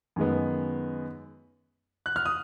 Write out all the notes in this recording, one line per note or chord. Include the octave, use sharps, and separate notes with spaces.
F#2 D#3 G#3 B3
F#6
F6
D#6